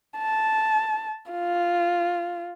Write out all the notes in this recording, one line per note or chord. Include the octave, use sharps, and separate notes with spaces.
A5
F4